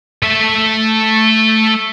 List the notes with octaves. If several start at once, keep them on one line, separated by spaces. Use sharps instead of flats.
A3 E5